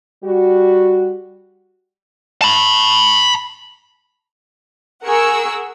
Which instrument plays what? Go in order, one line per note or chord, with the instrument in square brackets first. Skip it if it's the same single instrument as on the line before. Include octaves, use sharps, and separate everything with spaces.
[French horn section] G3 F#4
[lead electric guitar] A5 B5
[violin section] G#4 A#4 F#5 C#6 E6